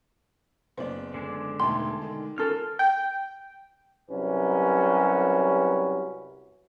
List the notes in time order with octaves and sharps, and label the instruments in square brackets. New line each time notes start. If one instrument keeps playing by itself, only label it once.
[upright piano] F#1 B3 D5 [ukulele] C5
[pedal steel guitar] D3 G#3 D4
[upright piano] E1 D#3 A3 [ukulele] G5 A5 [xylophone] C6
[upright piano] D#3
[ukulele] C#4 A4 A#4 [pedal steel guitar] F4 F6
[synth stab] G5
[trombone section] C2 F#3 C#4 G4 B4